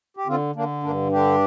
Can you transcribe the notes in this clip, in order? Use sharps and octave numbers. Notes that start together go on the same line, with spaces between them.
G4
D3 C4 F4
D3 A#3 D4
G2 A#3 D4
D3 D4 G4